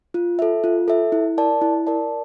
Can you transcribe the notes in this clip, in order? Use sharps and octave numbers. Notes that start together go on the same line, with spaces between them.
F4
A4 E5
F4
A4 E5
E4
A#4 D5 A5
E4
A#4 D5 A5